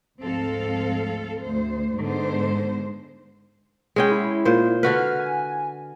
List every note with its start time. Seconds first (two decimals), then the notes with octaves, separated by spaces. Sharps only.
0.19 D2 G#2 F3 C4 A4 F5
1.42 D2 C5
1.97 G#2 D3 G#3 B3 C5
3.96 G#3 C#4 G#4 G5
4.11 E4
4.45 A#2 C5
4.83 D3 F#4 B4 F6
5.20 G#5